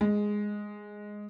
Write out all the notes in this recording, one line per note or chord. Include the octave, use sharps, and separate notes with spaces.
G#3